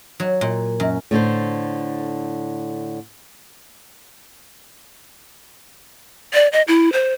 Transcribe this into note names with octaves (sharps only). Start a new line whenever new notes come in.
F#3
A#2
F#2
A2 D3 A4 C5
D5
D#5
E4
C5